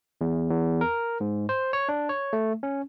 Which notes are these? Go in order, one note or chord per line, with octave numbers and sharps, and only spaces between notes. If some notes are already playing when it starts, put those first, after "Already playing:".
E2
E2
A#4
G#2
C5
C#5
D4
C#5
A3
C#4